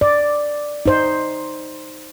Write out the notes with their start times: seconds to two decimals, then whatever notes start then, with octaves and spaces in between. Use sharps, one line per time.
0.01 D5
0.86 D#4 C5